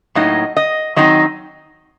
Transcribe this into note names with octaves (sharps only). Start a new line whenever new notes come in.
A2 F#3 A#3 D#4 D#5
D#5
D#3 F#3 C4 D#4 D#5